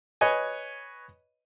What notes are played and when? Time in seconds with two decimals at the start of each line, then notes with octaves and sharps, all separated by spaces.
0.21 B4 C#5 D#5 G#5